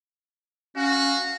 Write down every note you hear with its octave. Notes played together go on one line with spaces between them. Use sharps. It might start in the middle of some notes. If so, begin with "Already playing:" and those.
C#4 F#4 F5